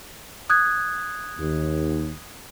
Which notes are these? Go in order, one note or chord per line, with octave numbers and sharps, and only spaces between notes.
D#6 F#6 G#6
D#2